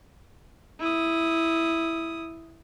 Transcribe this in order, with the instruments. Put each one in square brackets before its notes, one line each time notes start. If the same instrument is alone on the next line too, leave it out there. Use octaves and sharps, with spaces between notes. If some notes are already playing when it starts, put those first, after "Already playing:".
[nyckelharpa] E4 D#6